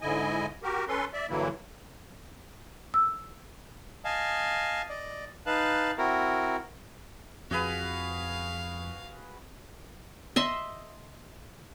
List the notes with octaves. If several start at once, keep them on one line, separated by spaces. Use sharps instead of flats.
G#2 D3 E4 D#5 G#5
F#4 G4 A#4
C#4 A4 B4 C6
D5 E5
G2 D3 E3 F#3 A#3 E4
E6
D#5 F5 G#5 A5
D5 D#5
D#4 B4 F5 A5 F#6
C4 E4 F#4 A#4
F2 F3 F#4 G#4 B4 F5
D#5 E5 C6